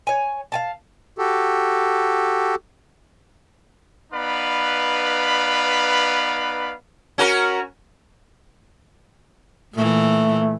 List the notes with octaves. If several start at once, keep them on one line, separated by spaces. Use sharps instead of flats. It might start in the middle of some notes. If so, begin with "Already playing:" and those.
C#5 G#5
F5 G#5 A5
F#4 G4 A4
B3 D#4 B4 D5 F5 B5
C#4 F#4 A#4
A#2 E3 A3